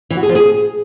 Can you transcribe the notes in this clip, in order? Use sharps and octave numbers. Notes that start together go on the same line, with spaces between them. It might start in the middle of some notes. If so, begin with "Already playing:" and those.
E3
F#4
G#4
F3
G#4